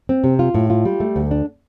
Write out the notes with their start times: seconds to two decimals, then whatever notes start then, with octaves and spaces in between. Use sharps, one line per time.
0.09 C4
0.24 C3
0.39 F4
0.54 A2
0.70 F4
0.85 G3
1.00 A3
1.16 D2
1.31 D4